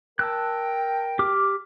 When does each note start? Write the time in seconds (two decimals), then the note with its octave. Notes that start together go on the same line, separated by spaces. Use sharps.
0.19 A#4 G5 A5 E6 F#6
1.19 G4 D6 F6